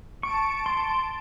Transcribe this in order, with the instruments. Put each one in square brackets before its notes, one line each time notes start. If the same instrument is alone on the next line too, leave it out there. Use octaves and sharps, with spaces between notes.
[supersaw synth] A5 D7 [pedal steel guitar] C#6
[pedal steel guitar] C6